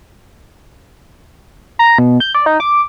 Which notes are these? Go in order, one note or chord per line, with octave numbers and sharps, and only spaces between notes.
A#5
B2
G6
D5
D#4
D6